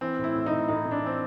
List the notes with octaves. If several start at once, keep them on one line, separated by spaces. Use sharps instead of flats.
E3 C4
A2
E4
A2
D#4
A2
A2 D#4
A2
D4
E3 C4